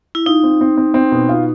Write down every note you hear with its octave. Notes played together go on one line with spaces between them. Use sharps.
E4
D#4 F4
C4
C4
C4
C4
B2
F4